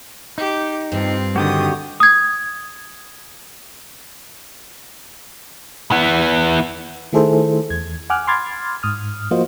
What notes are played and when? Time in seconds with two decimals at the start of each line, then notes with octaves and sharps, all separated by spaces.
0.38 D#4 G4
0.92 G2 C4 F4
1.36 D3 D#3 F#4 G4 D#6
2.00 D#6 G#6
5.91 E3 B3
7.13 D#3 A3 E4 G#4 A4 C5
7.70 E2 G#6
8.10 F#5 G#5 D6 F6 F#6
8.27 B5 C6 D6 F6 G#6 A6
8.83 G#2 D#6 F6
9.31 F3 A#3 F4 F#4 C5 D#5